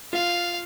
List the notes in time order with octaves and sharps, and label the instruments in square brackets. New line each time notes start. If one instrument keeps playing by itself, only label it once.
[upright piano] F4 [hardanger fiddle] F5